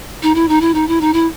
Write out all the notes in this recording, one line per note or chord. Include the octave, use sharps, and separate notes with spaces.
D#4
E4
D#4
E4
D#4
E4
D#4
E4